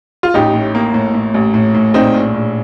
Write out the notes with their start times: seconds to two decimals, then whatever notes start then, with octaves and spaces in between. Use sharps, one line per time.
0.23 F4
0.34 A1 D#4 G4
0.54 A2
0.75 A#3
0.94 A2
1.14 A2
1.34 A1
1.54 A2
1.74 A2
1.94 A#1 C4 D#4
2.14 A#1
2.34 A#1